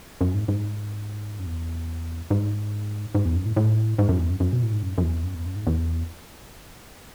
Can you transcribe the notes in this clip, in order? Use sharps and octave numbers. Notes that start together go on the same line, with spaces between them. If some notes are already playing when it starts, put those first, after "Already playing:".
F#2
G#2
G#2
F#2
E2
G#2
G#2
E2
F#2
A2
A2
G#2
F#2
E2
F#2
F#2
B2
A2
G#2
F#2
F#2
E2
F#2
E2
F#2
G#2
E2